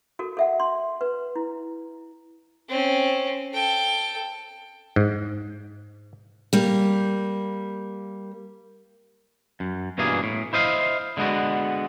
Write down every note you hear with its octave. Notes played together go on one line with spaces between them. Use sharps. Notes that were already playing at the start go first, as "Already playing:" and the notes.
F#4 A4 A#4
A4 E5 F#5
C6
B4
E4
C4 C#4
A4 G5
G#2
G3 A#3
F#2
G2 B2 E3 A#3 G#4
A2
E4 C5 D#5 F5
D3 G#3 B3 F#4